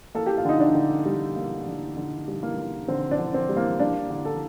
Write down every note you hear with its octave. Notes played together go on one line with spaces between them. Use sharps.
A#3 A4
G4
F4
D3 D#4
D4
D3
G3
A#3
D3
D3
G3
A#3
A#3
D3 C4
D4
D3
C4
G3
A#3
A#3 D4
D3
A4